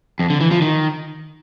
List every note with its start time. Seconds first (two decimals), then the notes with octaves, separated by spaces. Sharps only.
0.19 F2
0.30 D3
0.41 E3
0.51 F3
0.62 D#3